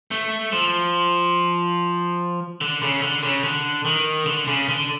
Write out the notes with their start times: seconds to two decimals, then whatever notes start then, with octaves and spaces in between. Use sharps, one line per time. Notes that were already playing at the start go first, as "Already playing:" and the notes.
0.11 A3
0.53 F3
2.61 D3
2.82 C#3
3.02 D3
3.23 C#3
3.43 D3
3.85 D#3
4.26 D3
4.47 C#3
4.68 D3